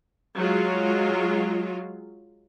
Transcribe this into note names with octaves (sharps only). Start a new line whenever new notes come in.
F#3 G#3 F4